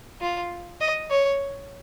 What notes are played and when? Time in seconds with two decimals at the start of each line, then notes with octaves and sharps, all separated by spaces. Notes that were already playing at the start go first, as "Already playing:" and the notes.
0.21 F4
0.80 D#5
1.10 C#5